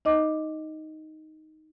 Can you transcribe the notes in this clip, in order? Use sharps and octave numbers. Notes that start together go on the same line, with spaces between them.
D#4 D#5 D6